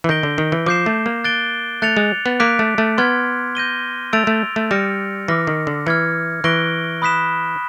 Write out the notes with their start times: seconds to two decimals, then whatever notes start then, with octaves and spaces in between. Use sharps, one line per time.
0.04 E3
0.09 D#3 G6 A#6 D7 G7
0.23 D3
0.38 D#3
0.52 E3
0.66 F3 D6 G6 C7 E7
0.86 A3
1.06 A#3
1.24 F#6 A6 D7 G7
1.82 A3 F#6 A6 C#7 F7
1.97 G#3
2.26 B3
2.40 A#3 D6 F#6 B6 D7
2.59 A3
2.78 A3
2.98 B3 C6 F6 G#6
3.55 G6 A#6 D#7 G7
4.13 A3 E6 A6 D7 F7
4.27 A3
4.56 A3
4.71 G3 F6 A#6 C#7
5.28 E3 D6 F6 A#6
5.47 D#3
5.67 D3
5.86 E3 F6 G#6 C#7
6.44 E3 C#6 F#6 A#6 D7 G7
7.02 B5 D#6 F#6 B6 E7